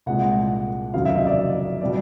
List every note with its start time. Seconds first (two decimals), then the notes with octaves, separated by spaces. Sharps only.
0.06 C2 A#2 F3 G#3 F#5
0.94 F1 D#2 C#3 F#3 F5
1.05 E5
1.15 D#5
1.26 D5
1.81 B2 G3 D5